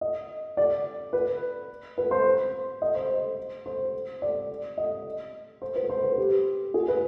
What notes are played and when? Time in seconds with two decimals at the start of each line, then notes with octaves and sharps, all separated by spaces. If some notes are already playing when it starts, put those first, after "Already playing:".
0.01 D#5
0.57 D5
1.13 B4
1.98 B4
2.11 C5
2.82 D#5
2.95 C5
3.66 C5
4.22 D5
4.78 D#5
5.62 C5
5.76 B4
5.89 C5
6.04 B4
6.18 G4
6.74 G#4
6.88 B4